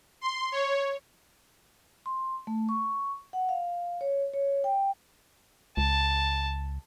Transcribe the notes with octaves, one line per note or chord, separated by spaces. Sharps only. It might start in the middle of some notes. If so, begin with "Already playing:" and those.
C6
C#5
C6
A3
C#6
F#5
F5
C#5
C#5
G5
C#2 A5